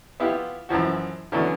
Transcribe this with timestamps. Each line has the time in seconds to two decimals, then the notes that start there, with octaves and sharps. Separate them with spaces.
0.20 B3 E4 F4 G4
0.69 F#2 E3 F3 F#4
1.32 D3 E3 F#3 B3 C#4 D4